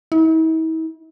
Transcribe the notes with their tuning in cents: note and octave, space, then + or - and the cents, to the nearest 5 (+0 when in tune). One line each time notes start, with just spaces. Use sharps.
E4 -45